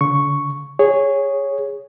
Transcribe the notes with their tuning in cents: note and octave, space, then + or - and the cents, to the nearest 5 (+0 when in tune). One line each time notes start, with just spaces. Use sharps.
D3 -45 C#6 +0
G#4 -15 C#5 +0